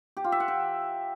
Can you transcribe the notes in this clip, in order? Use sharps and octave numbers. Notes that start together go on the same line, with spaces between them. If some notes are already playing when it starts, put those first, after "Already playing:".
G4
F4
E5
F#5
G5